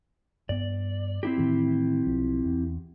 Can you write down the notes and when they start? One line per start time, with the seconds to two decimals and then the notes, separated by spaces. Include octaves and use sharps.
0.49 G2 B3 D5
1.23 C4 E4 G4
1.38 A2 D#3 E3
2.06 B1 F3
2.45 E2